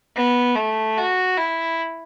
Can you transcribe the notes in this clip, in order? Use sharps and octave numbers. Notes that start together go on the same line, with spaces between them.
B3
A3
F#4
E4